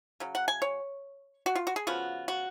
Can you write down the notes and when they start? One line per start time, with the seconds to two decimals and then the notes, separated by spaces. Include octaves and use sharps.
0.20 C#3 F#3
0.35 F#5
0.48 G#5
0.62 C#5
1.46 F#4
1.55 F4
1.67 F#4
1.76 G#4
1.87 C#3 F3 B3 F4 F#4
2.28 F#4